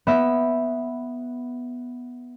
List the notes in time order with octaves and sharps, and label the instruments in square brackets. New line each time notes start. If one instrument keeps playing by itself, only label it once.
[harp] B3 E5